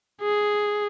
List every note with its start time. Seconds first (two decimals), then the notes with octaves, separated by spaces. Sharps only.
0.21 G#4